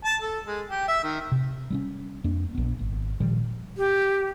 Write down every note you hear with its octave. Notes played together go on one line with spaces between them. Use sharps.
A5
A4
G#3
G4
E5
D#3
C3
G3 C4 C#4
F2 A#3 D4
A#1 B3
G#1
A#2 D#3 F3 G3
G4